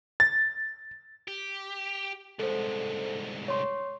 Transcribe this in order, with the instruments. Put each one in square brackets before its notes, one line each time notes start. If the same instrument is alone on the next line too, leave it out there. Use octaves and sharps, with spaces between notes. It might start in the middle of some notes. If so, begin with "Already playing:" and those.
[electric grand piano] A6
[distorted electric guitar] G4
[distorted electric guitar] C2 G#2 [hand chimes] A4 C5
[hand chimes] C#5 C6